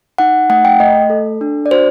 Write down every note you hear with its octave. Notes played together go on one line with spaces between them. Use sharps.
D#4 F#5
A3 F#5
G5
A3 D#5
A4
D4
D5
F#4 C5